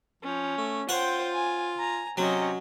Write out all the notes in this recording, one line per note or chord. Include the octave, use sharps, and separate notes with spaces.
F3 C#4
A3
F4 C5 C#5 F#5 G5
G#5
G#5 A#5
C3 F#3 C#4 D#5